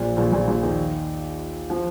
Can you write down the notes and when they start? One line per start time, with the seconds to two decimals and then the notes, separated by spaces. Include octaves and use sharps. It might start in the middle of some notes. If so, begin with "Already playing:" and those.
Already playing: A#1 A#2
0.17 A#1 A#2
0.32 A#1 A#2
0.48 A#1 A#2
0.63 D#2 D#3
1.70 F3